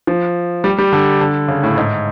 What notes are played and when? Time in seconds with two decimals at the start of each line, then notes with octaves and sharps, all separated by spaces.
0.07 F3
0.64 G3
0.78 G3
0.92 D3
1.21 D3
1.48 C#3
1.63 A2
1.78 G#2